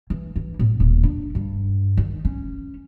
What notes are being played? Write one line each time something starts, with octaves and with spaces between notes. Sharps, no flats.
E3
E3
A2
D#1
D4
G2
D#3
C#4